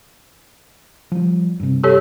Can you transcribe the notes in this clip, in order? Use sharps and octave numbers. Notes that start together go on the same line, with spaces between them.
F3 G3
G2 C3
G4 A4 C#5